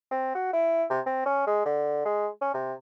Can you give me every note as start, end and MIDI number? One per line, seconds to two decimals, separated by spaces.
0.11 0.31 60
0.35 0.49 66
0.53 0.84 64
0.90 1.00 48
1.06 1.23 60
1.26 1.46 61
1.47 1.63 56
1.65 2.02 50
2.05 2.28 56
2.41 2.53 61
2.54 2.73 48